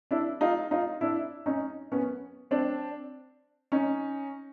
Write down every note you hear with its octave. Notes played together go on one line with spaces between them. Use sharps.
D4 E4
D#4 F4
D#4 F4
D4 E4
C#4 D#4
B3 C#4
C4 D4
C#4 D#4